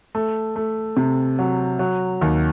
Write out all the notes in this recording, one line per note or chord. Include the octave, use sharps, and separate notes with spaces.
A3
A3
C3
F#3
F#3
D#2